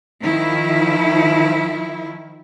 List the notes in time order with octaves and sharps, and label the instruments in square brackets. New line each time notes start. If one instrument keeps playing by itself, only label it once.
[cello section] D#3 F3 E4